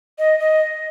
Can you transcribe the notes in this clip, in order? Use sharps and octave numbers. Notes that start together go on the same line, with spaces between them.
D#5
D#5